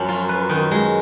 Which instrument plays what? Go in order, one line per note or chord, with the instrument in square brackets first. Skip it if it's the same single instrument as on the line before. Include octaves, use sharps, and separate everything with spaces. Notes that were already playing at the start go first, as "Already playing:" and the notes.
Already playing: [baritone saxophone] F#2 [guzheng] F3 C#4
[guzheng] F4
B4
D#3
[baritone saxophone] F#2 [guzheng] G#3